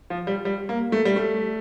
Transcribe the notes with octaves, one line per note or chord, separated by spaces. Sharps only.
F3
G3
G3
A#3
A3
G3
A3